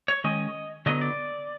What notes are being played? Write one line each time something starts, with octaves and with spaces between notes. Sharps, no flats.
C#5
D#3 G#3 C#4 D#5
D3 F#3 B3 D#4 D#5
D5